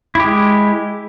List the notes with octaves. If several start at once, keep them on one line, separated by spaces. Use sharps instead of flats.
G#3 E4 G4